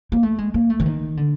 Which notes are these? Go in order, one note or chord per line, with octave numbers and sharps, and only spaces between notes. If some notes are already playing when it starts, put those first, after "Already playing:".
A#3
A3
G#3
A#3
A3
E3
D#3
D3